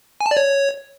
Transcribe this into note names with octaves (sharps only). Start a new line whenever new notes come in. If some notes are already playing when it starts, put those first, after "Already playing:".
G#5
A5
D5
C#5